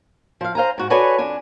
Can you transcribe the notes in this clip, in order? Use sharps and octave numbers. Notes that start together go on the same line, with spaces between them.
F3 F5
C5 F5 G#5 A#5
G#2 F#4
F#4 A4 B4 C#5 D5 G#5
F2 D4 G#5